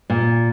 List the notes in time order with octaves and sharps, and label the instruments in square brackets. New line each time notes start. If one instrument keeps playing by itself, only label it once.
[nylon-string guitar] A#2